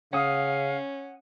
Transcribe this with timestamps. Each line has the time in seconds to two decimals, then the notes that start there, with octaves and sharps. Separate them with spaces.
0.13 C#3 C#4 F5 F#5 D#6